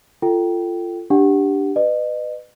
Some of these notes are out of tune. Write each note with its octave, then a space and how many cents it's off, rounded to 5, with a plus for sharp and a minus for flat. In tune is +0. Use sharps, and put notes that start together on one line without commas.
F4 -15 A4 +10 G5 -15
D4 +0 G4 +0 F#5 +10
B4 +20 D#5 -35